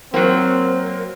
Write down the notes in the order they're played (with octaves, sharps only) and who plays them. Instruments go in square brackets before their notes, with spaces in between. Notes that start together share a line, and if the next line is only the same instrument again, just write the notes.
[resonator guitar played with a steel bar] F#3 A#3 [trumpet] C4